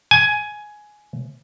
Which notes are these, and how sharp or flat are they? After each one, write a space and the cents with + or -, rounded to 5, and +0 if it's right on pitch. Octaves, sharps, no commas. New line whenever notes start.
G#5 +10